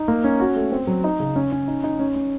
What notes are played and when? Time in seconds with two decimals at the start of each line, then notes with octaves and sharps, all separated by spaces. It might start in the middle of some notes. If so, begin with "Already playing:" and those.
Already playing: D#4
0.08 A#3
0.24 C#4
0.40 F#4
0.56 A3
0.72 C4
0.87 F#3
1.04 D#4
1.20 C#3
1.36 C#4
1.52 C#4
1.68 D#4
1.84 D#4
2.00 C#4
2.16 C#4